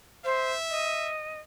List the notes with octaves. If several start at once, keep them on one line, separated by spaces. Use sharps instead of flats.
C5 E5
D#5